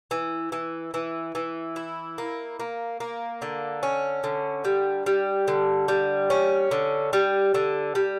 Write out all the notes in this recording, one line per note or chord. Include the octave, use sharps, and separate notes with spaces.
E3
E3
E3
E3
E4
A#3
A#3
A#3
D3
C#4
D3
G3
G3
D3
G3
C#4
D3
G3
D3
G3